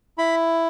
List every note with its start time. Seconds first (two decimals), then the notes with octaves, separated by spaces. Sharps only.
0.18 E4 B5